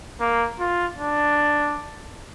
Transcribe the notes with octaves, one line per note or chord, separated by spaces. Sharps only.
A#3
F4
D4